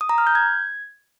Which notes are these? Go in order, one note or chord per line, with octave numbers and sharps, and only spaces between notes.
D#6
A#5
F6
G6
G#6